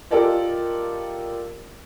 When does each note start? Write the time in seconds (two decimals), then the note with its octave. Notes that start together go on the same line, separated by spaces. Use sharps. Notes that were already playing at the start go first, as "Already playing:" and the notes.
0.11 F4 G4 A4 A#4 D5 D#5